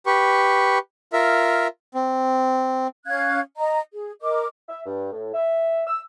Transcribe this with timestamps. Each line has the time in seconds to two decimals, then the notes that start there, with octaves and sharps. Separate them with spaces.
0.06 G4 B4 C#6
1.13 F4 A#4 E5
1.95 C4
3.06 C#4 F5 F#6 G#6
3.58 D#5 A#5
3.93 G#4
4.21 A#4 D#5 D6
4.69 E5
4.85 G2
5.12 A2
5.33 E5
5.87 E6